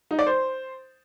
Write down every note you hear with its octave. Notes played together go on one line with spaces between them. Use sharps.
D#4
D5
C5